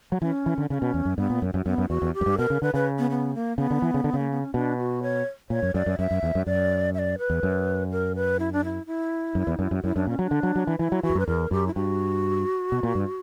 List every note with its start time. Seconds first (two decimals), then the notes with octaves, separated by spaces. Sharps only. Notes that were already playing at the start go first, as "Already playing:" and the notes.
0.12 F#3
0.21 E3 C#4
0.46 E3
0.58 D3
0.70 C#3 D4
0.74 C#4
0.82 B2
0.94 E2
1.05 F#2
1.17 G2 B3
1.30 A#2
1.42 F#2
1.54 F#2
1.66 F#2 B3
1.78 F#2
1.89 E2 F#4
2.02 E2
2.14 G4
2.21 F#2
2.26 G2
2.38 B2 A#4
2.50 C#3
2.62 D3 B4
2.74 C#3 B4
2.98 B3
3.10 B3
3.35 A#3
3.58 C#3 B3
3.71 D3
3.82 E3
3.94 C#3
4.04 D3
4.14 C#3 A#3
4.31 B3
4.42 C#4
4.54 B2 D4
4.78 F#4
5.03 C#5
5.50 A#2 C#5
5.63 F#2
5.74 F#2 D5
5.86 F#2
5.99 F#2 E5
6.11 F#2
6.23 E2
6.35 F#2
6.47 F#2 D5
6.94 E5
6.99 D5
7.19 B4
7.30 E2
7.43 F#2
7.92 A#4
8.15 B4
8.39 E4
8.53 D4
8.65 E4
8.87 E4
9.35 F#2
9.47 E2
9.59 F#2
9.71 F#2
9.84 F#2 E4
9.96 F#2 D4
10.07 A#2 C#4
10.19 F#3
10.23 D4
10.31 D3
10.43 F#3
10.56 F#3
10.67 E3
10.79 E3 E4
10.92 F#3
11.03 E3 F#4
11.10 E2
11.15 F#2
11.20 B4
11.27 E2 A#4
11.51 F#2 G4
11.67 E4
11.75 G2 F#4
12.72 B2
12.83 A#2
12.95 G2